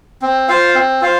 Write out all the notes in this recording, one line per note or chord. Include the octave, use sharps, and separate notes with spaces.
C4
F4 C5 F5
C4
F4 C5 F5